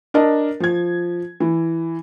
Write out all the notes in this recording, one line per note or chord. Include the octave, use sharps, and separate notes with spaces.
D4 A#4 D#5 A5
F3 G#6
E3